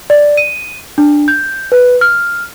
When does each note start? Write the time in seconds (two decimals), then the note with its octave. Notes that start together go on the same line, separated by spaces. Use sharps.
0.10 D5
0.37 D#7
0.98 D4
1.28 G6
1.72 B4
2.01 F6